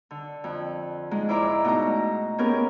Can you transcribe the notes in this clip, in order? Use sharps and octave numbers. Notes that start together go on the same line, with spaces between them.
D3
F2
G#2 G#3 G#4
E4 C5 D5 E5 A#5 D6
B2 A3 D#4 A#5
A#3 B3 C#4 G4 G#4 A#4